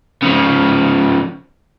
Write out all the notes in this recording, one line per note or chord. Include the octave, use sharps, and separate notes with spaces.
C#3 F3